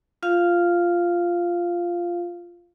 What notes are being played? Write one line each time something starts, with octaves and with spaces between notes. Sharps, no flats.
F4 F5